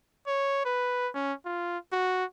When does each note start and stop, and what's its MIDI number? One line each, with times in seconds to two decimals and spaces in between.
0.27 0.63 73
0.65 1.09 71
1.14 1.33 61
1.45 1.78 65
1.92 2.24 66